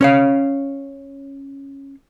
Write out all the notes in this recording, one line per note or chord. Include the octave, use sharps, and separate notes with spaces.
C#4 C#5 F5